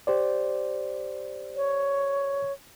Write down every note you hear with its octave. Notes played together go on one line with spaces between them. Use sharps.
G4 C5 D5
C#5